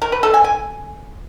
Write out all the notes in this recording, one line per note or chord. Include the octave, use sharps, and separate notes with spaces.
A#4
B4
A4
G#5
G#5